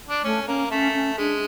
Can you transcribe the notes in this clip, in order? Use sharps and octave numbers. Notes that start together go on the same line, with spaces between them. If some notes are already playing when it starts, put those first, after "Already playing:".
D4
A3 C#4
A#3 C#4
A3 C#4
C#4
G#3 D4